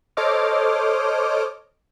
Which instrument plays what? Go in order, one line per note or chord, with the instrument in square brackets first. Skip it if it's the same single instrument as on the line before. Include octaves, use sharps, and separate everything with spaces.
[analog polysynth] A4 C5 C#5 D#5 D6 F6